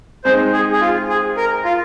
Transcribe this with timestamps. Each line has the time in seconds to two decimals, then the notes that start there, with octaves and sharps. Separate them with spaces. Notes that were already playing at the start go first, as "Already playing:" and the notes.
0.24 G#3 C4 D#4 C5
0.53 G#4
0.72 G#4
0.81 F4
1.09 G#4
1.37 A#4
1.65 F4